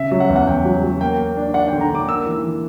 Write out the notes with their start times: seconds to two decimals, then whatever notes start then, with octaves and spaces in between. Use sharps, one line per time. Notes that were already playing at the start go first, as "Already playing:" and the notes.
Already playing: C#3 E5
0.11 F#3
0.20 F#5
0.29 E2
0.36 F#5
0.47 E2 G5
0.65 F#3
0.83 F#3
1.01 A#3 G5
1.18 A#3
1.37 D4
1.54 D4 F#5
1.68 G5
1.73 D3
1.81 A#5
1.91 D3 D6
2.08 A#3 E6
2.26 E3
2.44 E3